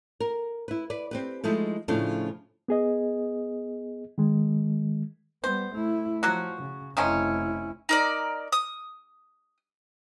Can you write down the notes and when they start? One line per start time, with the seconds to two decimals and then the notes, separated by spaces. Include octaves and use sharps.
0.20 A#4
0.68 E4 B4
0.90 B4 D5
1.11 C4 G4 B4
1.44 F3 G#3 A3 D#4 E4
1.88 A2 C#3 F3 A3 D4 F4
2.68 B3 G#4 D#5
4.18 D#3 G#3
5.44 G3 B3 C5
5.72 A3 E4
6.23 F3 F#3 F#4
6.61 C#3
6.97 F1 D#3 F3 C#4 E4
7.89 D#4 A#4 D5
8.52 D#6